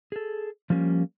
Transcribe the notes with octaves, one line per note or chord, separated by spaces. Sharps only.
G#4 A4
F3 G3 A#3 C#4